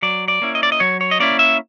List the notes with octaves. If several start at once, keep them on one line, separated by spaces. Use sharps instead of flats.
F#3 D5
D5
A#3 C#4 E4
D#5
D5
D#5
F#3 C#5
C#5
D#5
A#3 C#4 E4 D5
E5